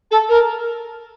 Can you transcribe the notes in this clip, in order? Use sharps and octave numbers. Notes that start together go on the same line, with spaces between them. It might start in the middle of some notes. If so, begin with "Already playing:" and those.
A4
A#4